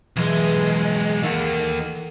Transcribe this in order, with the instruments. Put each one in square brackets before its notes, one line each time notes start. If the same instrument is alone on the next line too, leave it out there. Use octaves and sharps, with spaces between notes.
[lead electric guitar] B1 G#3 [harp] E3
[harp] D#5 E7
[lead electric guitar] D#3 A#3 [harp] A4 A#4 F#5